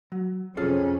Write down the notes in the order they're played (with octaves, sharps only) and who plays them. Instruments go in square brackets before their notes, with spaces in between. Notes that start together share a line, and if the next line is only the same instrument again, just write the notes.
[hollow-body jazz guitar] F#3
[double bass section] F2 C3 C#4 [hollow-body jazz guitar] F4 G#4 A4